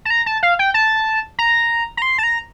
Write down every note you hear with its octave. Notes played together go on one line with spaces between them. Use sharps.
A5
A#5
A5
F5
G5
A5
A#5
A#5
C6
A5
A#5